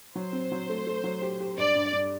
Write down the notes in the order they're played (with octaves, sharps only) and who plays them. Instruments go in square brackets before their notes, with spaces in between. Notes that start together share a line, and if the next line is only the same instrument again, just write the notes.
[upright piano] F#3 [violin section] C5
[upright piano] C4
F#3
A3
A3
F#3
G4
G4
[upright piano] G2 [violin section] D5
[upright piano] G2
G2